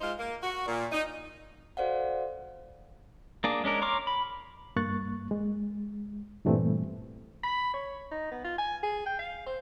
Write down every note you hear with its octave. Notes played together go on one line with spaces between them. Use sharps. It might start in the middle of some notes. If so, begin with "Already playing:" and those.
G#3 D#4 F4 C5
A#3
F#4
A#2
D#4
F#4 A4 C5 D5 F5 F#5
A#3 D4 G#4
G#3 C#4 D4 A#4
C#5 A#5 C6 D6 F6
B5
G2 A#3 C#6 F#6 A6
G#3
G2 A#2 E3 G3 A3 C4
B5
C#5
D#4
B3
F4
G#5
G#4
G5
F5
C5